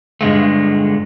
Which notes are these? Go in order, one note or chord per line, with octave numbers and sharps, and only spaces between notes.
G2 D3 G#3 A3